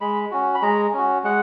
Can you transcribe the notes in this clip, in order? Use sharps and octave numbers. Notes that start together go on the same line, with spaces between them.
G#3 B5
C#4 F#4
B5
G#3 A#5
C#4 F#4
G#3 F#5